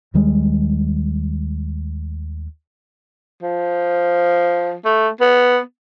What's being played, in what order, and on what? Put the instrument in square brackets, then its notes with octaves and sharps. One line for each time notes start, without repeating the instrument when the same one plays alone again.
[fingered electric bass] D#2 D#3 G3 G#3
[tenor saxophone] F3
A3
B3